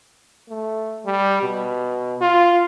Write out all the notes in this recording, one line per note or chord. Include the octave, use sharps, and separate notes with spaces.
A3
G3
B2
F4